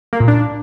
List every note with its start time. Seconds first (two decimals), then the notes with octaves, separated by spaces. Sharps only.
0.13 A#3
0.20 A#2
0.28 D4